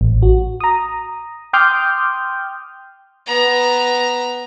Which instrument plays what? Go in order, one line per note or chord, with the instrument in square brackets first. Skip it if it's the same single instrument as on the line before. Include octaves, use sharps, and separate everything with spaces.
[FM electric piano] A1
F#4
A#5 D#6
G5 C6 D6 D#6 F6 G6
[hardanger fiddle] B3 A#5